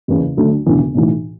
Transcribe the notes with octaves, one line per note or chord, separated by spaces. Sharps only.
F#1 E2 C#3
D2 D3 F#3 A3
E1 D2 C#3 E3 B3
B1 A2 E3